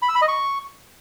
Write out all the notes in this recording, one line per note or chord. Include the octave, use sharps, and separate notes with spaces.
B5
E6
B5
D#5
C#6